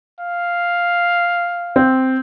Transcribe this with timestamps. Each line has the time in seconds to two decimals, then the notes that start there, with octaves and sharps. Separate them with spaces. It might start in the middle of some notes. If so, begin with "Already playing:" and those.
0.20 F5
1.76 C4